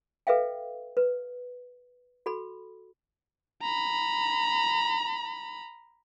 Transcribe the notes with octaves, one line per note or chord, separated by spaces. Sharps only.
A4 B4 E5 F5 G5
B4
F#4 A4 B5
A#5 B5